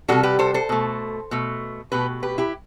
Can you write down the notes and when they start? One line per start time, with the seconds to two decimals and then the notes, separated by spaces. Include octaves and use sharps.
0.08 C3 E3 G3 F#4 A4
0.23 G4 B4
0.39 A4 C5
0.54 A4 C5
0.69 B2 A3
1.31 B2 A3
1.92 B2 A3 G4 B4
2.23 G4 B4
2.38 E4 G4